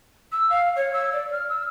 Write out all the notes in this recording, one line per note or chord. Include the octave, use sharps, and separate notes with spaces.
E6
F5
C#5
E6
D5
F6
E6